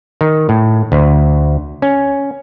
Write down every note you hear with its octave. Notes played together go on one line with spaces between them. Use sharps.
D#3
A2
D2
C#4